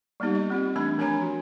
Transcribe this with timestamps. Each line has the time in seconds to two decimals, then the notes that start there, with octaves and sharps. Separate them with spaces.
0.20 G3 A#3 B3 D#4 G4
0.35 D#5
0.50 C4 F4 G4
0.76 E3 A3 D4 B5
0.98 F3 D4 A#4 C#5 G#5 A#5
1.22 F#4